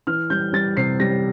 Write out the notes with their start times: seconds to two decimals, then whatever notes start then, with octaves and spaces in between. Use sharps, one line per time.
0.07 E3 F6
0.30 G3 G6
0.53 G3 A6
0.77 C3 C7
1.00 G3 A#6